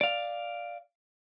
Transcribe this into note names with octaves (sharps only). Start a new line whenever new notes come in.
D5 F5